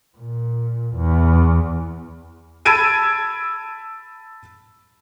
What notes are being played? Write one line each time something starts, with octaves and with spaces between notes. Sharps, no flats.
A#2
E2
A5 B5 E6 G#6 D7 D#7